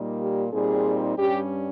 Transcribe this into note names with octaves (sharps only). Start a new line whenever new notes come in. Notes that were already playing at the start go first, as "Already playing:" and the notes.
Already playing: A#2 G3 A#3 D#4
G4
A#2 G3 C4 D#4 G#4
G2 G3 C#4 G4